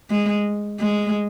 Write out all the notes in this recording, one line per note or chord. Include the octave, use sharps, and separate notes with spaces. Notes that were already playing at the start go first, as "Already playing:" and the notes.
G#3
G#3